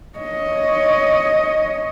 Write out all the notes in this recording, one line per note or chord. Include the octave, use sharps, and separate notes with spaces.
C#5 D#5